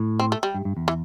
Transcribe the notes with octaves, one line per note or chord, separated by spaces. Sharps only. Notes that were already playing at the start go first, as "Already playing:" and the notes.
Already playing: A2
C4
A3
G3
G2
G2
E2
E3